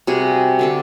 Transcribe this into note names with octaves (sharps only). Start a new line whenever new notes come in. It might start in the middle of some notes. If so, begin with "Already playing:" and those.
C3 G3 F#4 G#4
D3 G4 A4